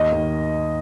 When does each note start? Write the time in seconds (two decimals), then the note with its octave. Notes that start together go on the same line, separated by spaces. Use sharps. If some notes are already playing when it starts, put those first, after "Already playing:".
Already playing: D#2 D#5
0.12 D#3